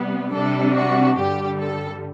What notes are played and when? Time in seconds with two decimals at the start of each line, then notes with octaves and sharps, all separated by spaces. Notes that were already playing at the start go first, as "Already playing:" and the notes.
Already playing: C3 G3 B3
0.33 C3 G3 D4 A4
0.75 F#4
1.17 G2 D3 G3 G4
1.59 A4